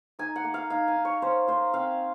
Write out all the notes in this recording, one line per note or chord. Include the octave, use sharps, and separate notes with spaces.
D#4 G#5
F#5
A#3
F5
D#4 F5
G#5
D#4
C#5
C#4 C5
A#3 C5
C4 F5